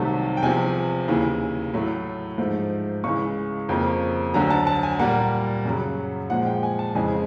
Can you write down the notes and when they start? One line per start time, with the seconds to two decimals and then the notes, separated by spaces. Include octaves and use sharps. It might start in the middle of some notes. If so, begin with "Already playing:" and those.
Already playing: C2 C3 D#3 F#3 A3 A5
0.37 G5
0.42 E2 C3 F3 G#5
1.08 D#2 C#3 E3
1.74 A2 F#3 A3
2.38 G#2 F3 A3
3.04 C#2 C#3 E3 C#6
3.69 F2 C#3 F3 A#3
4.34 D2 D3 F#3 A#5
4.50 A5
4.67 A5
4.83 G#5
4.99 A#2 G3 A#3 F#5
5.65 F#2 C#3 F#3
6.30 A#2 F3 G#3 F#5
6.47 G5
6.63 G#5
6.79 A5
6.95 F2 C#3 E3 G#3 G#5